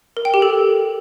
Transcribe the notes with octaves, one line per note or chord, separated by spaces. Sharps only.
A#4
G5
G4
A4